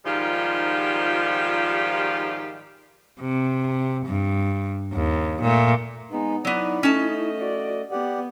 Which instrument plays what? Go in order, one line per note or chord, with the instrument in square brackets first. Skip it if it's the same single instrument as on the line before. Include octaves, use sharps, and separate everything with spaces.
[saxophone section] G#2 D#3 F3 G3 F4 G4
[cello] C3
G2
D#2
A#2 A3
[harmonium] G#3 D#4 [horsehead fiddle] B3
[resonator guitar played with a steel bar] F#3 B3 [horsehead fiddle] D#4 E4 [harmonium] D5
[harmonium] A3 D#5 [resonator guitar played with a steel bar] C#4 A5
[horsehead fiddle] F#4 D5
[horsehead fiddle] B3 [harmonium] G4 D5 F#5